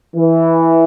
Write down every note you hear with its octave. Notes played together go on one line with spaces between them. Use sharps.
E3